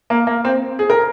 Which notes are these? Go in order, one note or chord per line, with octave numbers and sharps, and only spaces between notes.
A#3
A#3
C4
G#4
A#4